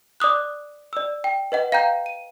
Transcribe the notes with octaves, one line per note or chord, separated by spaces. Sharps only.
D5 D6 D#6 F#6
D5 E6
G5
B4 D#5 F#5
F5 G5 A#5 G6
D#7